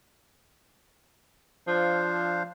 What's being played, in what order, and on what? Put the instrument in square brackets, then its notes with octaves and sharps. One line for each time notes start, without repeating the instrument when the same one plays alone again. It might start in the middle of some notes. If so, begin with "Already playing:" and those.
[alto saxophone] F3 [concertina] D4 C5 F5